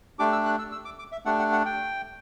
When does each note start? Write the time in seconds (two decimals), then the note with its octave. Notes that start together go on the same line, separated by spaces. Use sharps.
0.19 A3 D4 G4 D6
0.32 E6
0.46 F#6
0.59 E6
0.72 E6
0.85 D6
0.99 D6
1.12 E5
1.25 A3 D4 G4 F#5
1.39 F#5
1.52 F#5
1.66 G5